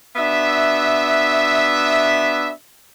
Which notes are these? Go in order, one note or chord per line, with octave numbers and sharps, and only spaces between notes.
B3 D4 F#4 E5